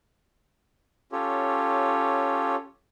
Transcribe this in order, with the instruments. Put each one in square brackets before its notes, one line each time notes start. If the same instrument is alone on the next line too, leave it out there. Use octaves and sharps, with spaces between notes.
[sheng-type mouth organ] C#4 F4 G4 A4 C#5